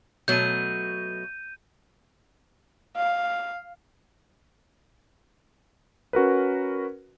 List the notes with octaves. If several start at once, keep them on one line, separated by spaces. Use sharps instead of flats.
B2 F#3 A3 G6 D#7
F5
C#4 F#4 A#4 B4